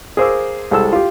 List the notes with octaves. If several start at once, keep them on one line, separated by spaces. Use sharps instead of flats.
G#4 A#4 C5 F5 D6 E6
C2 G#3 A4 E6
F4 G4